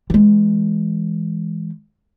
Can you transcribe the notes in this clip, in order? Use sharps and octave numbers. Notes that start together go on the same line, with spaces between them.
E3 G#3